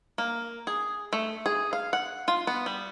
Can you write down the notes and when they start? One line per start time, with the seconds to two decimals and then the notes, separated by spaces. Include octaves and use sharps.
0.18 A#3
0.67 G#4
1.13 A3
1.46 G#4
1.73 F5
1.93 F#5
2.28 F4
2.47 B3
2.66 G3